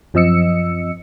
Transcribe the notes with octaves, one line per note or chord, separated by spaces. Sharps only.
F#2 F3 C4 D#5 E6 C#7